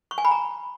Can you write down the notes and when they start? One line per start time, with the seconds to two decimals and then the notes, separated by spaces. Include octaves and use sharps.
0.11 C#6
0.18 G#5
0.25 B5
0.31 A#5